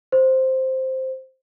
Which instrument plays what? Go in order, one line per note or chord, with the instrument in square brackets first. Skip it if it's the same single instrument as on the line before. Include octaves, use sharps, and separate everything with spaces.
[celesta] C5